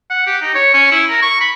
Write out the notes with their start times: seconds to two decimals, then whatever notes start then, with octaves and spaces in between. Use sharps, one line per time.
0.10 F#5
0.26 G4
0.41 D#4
0.54 C#5
0.74 C#4
0.91 E4
1.09 A#4
1.22 C#6
1.41 B5